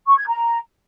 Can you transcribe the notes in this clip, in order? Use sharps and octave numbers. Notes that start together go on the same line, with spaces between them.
C#6
G#6
A#5